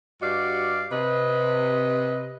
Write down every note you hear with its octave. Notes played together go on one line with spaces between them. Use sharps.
G2 F#4 G4 D5 D#5 F5
C3 B4 D#5